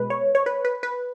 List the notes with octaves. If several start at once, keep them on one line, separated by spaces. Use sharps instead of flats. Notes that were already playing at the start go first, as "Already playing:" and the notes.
Already playing: B2 G#3 B4
C#5
C#5
B4
B4
B4